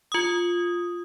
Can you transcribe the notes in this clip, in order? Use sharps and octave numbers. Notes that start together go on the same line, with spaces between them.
F4 D#6